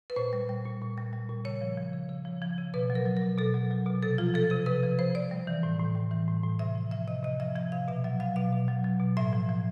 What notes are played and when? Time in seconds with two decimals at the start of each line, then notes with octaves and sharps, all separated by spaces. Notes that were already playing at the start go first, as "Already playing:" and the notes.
0.10 B4
0.16 A#2 C5
0.33 G3
0.49 G3
0.65 A#2
0.82 A#2
0.98 G3
1.13 G3
1.29 A#2
1.45 C#3 C#5
1.61 F3
1.78 F3
1.93 C#3
2.09 C#3
2.25 F3
2.42 F3
2.58 C#3
2.74 B2 B4
2.90 F#3
2.95 A#4
3.06 F#3
3.17 A#4
3.22 B2
3.38 B2 A4
3.54 F#3
3.71 F#3
3.86 B2
4.03 C3 A4
4.18 F3 F4
4.34 F3 A4
4.50 C3 A4
4.66 C3 B4
4.83 F3
4.99 F3 C5
5.15 C3 D5
5.31 G3
5.47 E3
5.63 A2
5.79 A2
5.95 G3
6.11 E3
6.28 A2
6.43 A2
6.59 C3 E5
6.75 F3
6.91 F3 E5
7.07 C3 D#5
7.23 C3 D#5
7.40 F3 E5
7.56 F3 E5
7.72 C3 F5
7.88 B2 E5
8.04 F#3 E5
8.20 F#3 F5
8.36 B2 F5
8.52 B2
8.68 F#3
8.84 F#3
9.00 B2
9.17 A2 E5
9.33 F3
9.49 F3